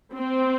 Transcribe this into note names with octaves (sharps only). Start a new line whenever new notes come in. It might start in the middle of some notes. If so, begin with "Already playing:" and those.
C4